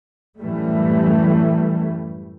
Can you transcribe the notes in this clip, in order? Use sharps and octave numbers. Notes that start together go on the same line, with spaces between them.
F#2 A2 E3 G3 A3